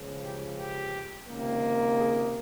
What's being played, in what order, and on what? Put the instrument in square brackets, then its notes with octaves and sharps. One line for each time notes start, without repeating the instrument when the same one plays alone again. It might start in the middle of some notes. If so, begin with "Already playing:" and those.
Already playing: [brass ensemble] C#2 C#3 F3
G4
G4
C#2 C3 D#3 A#3
G#4